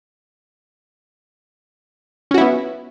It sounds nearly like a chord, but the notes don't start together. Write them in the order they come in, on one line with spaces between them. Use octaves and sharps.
C#4 F#4 E4 B3